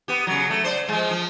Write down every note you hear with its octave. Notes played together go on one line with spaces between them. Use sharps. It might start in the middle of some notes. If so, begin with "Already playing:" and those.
B3 G4
C#3 F#3
A3
C5 D5
F3 G#3
F3